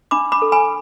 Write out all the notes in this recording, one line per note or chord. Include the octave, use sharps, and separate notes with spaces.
D4 B5 D6
B5 D6
A4
G#5 B5